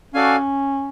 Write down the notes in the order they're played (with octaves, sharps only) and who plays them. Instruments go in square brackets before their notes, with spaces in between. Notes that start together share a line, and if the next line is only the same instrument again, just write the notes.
[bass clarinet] C#4 [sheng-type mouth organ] F#4 A4 D5 F5 G#5